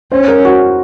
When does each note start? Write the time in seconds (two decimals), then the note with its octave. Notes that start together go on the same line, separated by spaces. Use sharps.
0.12 C#4 C5
0.28 A#4
0.45 F#4